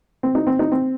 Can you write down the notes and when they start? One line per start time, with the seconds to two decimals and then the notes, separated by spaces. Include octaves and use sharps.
0.23 C4
0.35 D#4
0.47 C4
0.59 D#4
0.72 C4